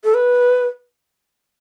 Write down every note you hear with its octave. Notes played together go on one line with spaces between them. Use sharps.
A4
B4